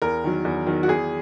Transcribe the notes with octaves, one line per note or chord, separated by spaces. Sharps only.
E2 A#4
D#3 F#3
E2
D#3 F#3
F#4
E2 G#4